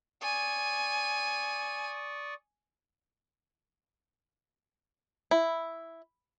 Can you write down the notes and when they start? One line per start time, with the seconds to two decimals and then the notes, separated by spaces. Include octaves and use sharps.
0.22 D5 G#5 C#6 D#6
5.31 E4